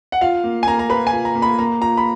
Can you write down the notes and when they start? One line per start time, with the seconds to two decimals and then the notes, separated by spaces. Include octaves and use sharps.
0.12 F#5
0.21 F4 F5
0.44 A#3
0.63 G#5
0.67 A#3 A#5
0.79 A#5
0.90 B4 B5
1.07 G#5
1.12 F4
1.25 A#5
1.35 A#3
1.42 B5
1.59 A#3 A#5
1.81 F4 A#5
1.97 B5